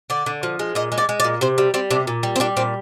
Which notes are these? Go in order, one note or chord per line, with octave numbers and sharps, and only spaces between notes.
D3 D5
D3
F3
G#3
A#2 D#5
G#3
D5
G#3
D5
A#2
C3 C5
G3
G3 C4
C3 D4
A#2
G3
C4
G3 D4
A#2 C4